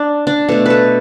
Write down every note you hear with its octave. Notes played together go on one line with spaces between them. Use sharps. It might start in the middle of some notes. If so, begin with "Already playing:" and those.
Already playing: D4
D4
B2 A3 A4
A4 B4